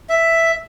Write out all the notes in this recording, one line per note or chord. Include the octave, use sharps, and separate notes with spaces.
E5